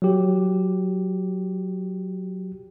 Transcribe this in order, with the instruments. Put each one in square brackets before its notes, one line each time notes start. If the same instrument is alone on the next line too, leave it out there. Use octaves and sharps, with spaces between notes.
[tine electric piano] F#3 G4